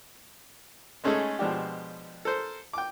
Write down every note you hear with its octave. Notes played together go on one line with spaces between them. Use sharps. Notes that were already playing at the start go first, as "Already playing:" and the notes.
G#3 A3 C#4 D#4 G#4 A4
B2 F3 G#3 D4 G4
A4 A#4 C5
G5 D6